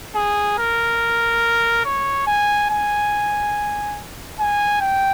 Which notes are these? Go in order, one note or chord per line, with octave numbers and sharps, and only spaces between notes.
G#4
A#4
C#5
G#5
G#5
G#5
G5